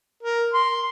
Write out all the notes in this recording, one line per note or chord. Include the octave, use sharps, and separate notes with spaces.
A#4
C6